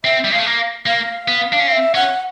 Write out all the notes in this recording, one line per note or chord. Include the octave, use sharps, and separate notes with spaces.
C4 E5
G3
G#3 F5
A3
A#3
A#3 F5
B3
D4
C#4
C4 F5
E5
C#4 F#5